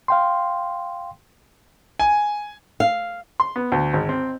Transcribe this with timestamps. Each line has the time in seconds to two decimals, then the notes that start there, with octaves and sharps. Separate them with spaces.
0.08 F5 G5 C6
2.00 G#5
2.80 F5
3.40 C6
3.56 B3
3.72 D2
3.93 G#1
4.09 C4